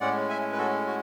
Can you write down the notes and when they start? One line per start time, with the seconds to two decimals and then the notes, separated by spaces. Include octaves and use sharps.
0.01 A2 G#3 C#4 D5 F#5
0.29 E5 G#5
0.53 B4
0.58 F#4 A4
0.87 F#4